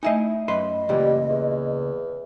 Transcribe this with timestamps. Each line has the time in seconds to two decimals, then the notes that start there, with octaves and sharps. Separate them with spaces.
0.03 A3 D#4 E4 D#5 E5 G#5
0.48 F#2 B4 D#5 C6
0.89 C#2 A#2 E3 G3
1.29 E2